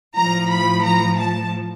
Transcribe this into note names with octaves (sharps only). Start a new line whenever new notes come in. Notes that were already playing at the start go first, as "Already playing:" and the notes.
A2 F3 A#5
B5
A#5
A5